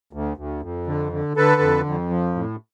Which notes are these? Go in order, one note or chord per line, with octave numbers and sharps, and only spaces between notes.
D2
D2
F2
D3
D3
D3 A4 B4
F2
F2
F3
A2